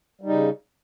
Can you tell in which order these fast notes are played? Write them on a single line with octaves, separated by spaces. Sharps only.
G3 D#4 C#3